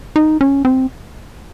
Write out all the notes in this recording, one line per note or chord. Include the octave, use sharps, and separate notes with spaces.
D#4
C#4
C4